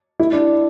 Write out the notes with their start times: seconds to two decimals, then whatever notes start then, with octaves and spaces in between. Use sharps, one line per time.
0.20 E4
0.32 D4